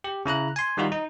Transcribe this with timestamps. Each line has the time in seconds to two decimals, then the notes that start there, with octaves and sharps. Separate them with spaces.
0.04 G4
0.26 C#3 E4 A#5 F#6
0.56 G#5 C6
0.77 D#3 G3 D#4 F4 F#4
0.92 D#4